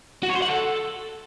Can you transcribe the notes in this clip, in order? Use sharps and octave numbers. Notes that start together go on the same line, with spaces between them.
F#4
C#5
C5
F#5
A4